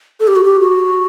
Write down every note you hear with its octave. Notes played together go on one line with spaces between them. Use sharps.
A4
G4
F#4
G4
F#4